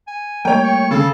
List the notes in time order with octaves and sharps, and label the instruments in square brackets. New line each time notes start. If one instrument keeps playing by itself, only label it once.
[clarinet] G#5
[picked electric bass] G3 A3 A#3 [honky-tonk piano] C#5 G5
[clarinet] C#6
[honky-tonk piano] C#3 [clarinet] A4